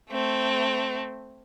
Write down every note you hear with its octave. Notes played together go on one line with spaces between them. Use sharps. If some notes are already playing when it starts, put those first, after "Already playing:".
A3 C4